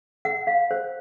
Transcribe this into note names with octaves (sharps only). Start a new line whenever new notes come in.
F#5
F5
C5